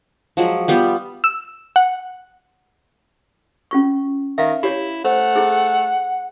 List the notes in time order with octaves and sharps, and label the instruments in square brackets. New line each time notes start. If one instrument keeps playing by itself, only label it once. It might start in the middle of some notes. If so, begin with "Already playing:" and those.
[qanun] F3 F#3 G#3
G3 B3 F4 G5
[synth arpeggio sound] E6
F#5
[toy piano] C#4 F4 C#6
[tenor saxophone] D#3 [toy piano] E5 F5
[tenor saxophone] E4 [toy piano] G4 C#5
[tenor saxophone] A3 [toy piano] C5 [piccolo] F#5
[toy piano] E4 G#4